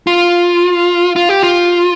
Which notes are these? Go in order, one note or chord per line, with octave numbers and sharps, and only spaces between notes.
F4
F4
G4
F4